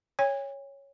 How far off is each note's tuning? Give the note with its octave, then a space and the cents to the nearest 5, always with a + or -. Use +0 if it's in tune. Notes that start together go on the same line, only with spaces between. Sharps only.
C#5 +0 G#5 -45